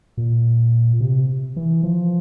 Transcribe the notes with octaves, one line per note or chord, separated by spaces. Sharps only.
A#2
C3
E3
F3